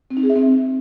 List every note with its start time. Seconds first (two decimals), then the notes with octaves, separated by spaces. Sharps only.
0.11 C4
0.17 D#4
0.23 G#4
0.30 E5
0.36 C4